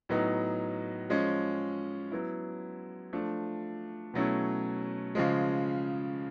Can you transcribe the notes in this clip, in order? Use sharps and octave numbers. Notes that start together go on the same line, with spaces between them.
A2 F#3 B3 D#4
F3 G#3 C#4
F#3 B3 E4
F3 A3 D4
B2 F#3 A3 C#4 E4
C#3 F3 G#3